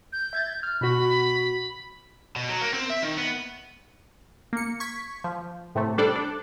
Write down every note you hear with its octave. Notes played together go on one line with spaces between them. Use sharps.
G6
E5 G#6 A6
F6
B2 F#4 B5
B2
F#3
A#3
C4
E5
D#3
B3
A#3 C#7
C#6 G#6 B6
F3
A2 C3 A3
G3 D4 A4 C5 D5
D4